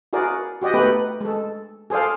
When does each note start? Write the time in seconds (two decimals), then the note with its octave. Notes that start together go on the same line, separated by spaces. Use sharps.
0.13 E4 F#4 G#4 A#4 D5
0.62 F#4 G4 D5 D#5
0.74 A3 B3 D#4 G4 B4
1.21 G#3 A4
1.90 G#4 A4 C5 D5 F5